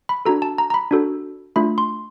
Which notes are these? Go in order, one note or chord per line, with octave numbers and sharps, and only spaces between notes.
B5
D4 F#4 A4 A#5
A5
A#5
A#5
B5
D4 F#4 A4
A3 D4 F4 B5
C6